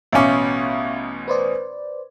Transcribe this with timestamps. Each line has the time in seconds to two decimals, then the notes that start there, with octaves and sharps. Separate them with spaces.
0.13 A1 B2 C#4 E5 F5 D6
1.28 B4 C5 D5